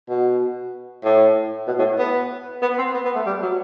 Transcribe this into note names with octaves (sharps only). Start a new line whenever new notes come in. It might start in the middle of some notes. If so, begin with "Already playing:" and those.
B2
A2
B2
A2
B3
B3
C4
B3
B3
A3
G3
F#3